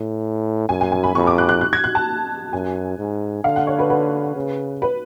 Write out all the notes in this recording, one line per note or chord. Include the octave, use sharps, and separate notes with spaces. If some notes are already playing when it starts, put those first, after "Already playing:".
Already playing: A2
F#2 G#5
G#5
G#5
B5
F2 C#6
D6
F#6
F#6
F#6
G#6
F#6
A5
F#2 G#5
G#2
D3 F5
F#5
C#5
B4
B4
C#3
B4